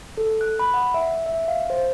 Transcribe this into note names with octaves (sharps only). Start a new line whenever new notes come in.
A4
F#6
B5
F#5
E5
E5
F5
C5